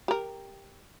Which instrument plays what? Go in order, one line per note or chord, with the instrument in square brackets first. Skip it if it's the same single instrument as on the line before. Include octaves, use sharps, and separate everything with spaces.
[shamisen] G4 A#4